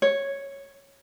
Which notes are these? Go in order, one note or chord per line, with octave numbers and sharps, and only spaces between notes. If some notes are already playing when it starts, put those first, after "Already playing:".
C#5